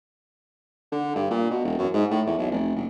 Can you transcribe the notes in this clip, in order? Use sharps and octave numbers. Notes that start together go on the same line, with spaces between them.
D3
G2
A#2
B2
E1
F#2
G#2
A2
E2
B1
F1
F#1